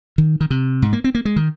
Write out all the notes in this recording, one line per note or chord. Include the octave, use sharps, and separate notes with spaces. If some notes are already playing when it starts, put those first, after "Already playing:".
D#3
D#3
C3
G#2
A#3
C4
A#3
G#3
D#3